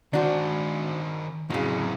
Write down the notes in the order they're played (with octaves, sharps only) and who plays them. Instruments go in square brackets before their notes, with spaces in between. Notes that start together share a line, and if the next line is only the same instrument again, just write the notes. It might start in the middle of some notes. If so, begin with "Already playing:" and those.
[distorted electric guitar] D#3 C5 [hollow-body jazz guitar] D4 F#4
[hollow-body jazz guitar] F2 C#3 [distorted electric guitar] A2 F#3